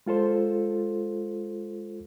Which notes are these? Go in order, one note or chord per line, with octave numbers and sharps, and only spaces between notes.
G#3 F4 A4 C5